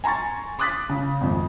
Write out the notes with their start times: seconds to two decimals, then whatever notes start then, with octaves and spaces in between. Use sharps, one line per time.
0.04 G#5 A#5 C6 C#6 A6
0.59 C6 D6 D#6 F#6 A6 B6
0.89 C#3
1.21 G#1 F2